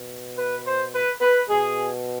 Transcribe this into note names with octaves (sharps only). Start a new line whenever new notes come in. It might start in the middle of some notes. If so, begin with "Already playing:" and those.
Already playing: B2
B4
C5
B4
B4
B2 G#4